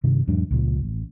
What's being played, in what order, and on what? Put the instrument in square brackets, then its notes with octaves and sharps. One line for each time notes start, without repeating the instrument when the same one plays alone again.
[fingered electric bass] G2 C3 D#3
E2 G#2 F#3 D4
C#2 A#2 F3
A1